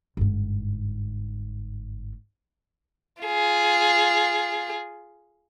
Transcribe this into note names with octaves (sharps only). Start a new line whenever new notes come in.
G1 G#2
F4 G#4